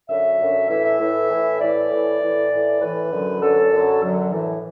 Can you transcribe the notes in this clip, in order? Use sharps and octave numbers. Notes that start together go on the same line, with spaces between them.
F#2 D3 F#3 E5
F#2 D3 F#3
A2 E3 E5
E5
A2 E3
A2 E3
A2 E3 D5
A2 E3
A2 E3
A2 E3
A2 E3 B4
F#2 D3 F#3
F#2 D3 F#3 A4
F#2 D3 F#3
F#2 D3 F#3
A2 E3